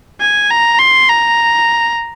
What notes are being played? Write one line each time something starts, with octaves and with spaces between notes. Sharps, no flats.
G#5
A#5
C6
A#5